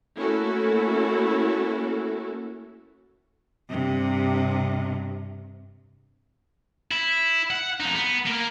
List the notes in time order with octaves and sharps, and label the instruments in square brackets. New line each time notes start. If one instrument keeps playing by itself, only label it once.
[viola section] A3 A#3 C#4 E4 F#4 A4
[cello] G2 C3
[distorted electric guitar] E4
F#5
F2 D#4
B3
A#3 A#4